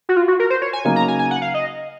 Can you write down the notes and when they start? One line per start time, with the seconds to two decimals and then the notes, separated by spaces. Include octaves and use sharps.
0.09 F#4
0.17 F4
0.28 F#4
0.40 A#4
0.50 C5
0.62 C#5
0.73 G#5
0.85 C#3 F#3 A#3 D#4 G#5
0.96 A#5
1.08 G#5
1.19 G#5
1.31 F#5
1.42 F5
1.54 D#5